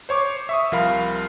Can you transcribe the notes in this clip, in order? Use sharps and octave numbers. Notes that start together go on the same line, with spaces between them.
C5 C#5 C#6 D6
E5 C#6 D#6
C2 F3 A#4 F5 B5